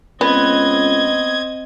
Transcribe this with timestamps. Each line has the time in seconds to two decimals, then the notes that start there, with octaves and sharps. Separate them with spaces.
0.21 C#2 B3 C4 D#5 G#6